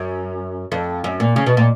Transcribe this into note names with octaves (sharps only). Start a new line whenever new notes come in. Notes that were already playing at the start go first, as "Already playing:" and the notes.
Already playing: F#2
F2
F#2
A#2
C#3
B2
A#2